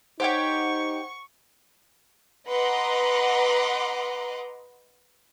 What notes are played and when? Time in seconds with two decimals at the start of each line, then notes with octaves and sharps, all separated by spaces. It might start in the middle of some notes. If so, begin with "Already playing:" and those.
0.20 D#4 G4 C5 C#5 F#5 G5 C#6
2.48 B4 D#5 F#5 A#5 C6 D6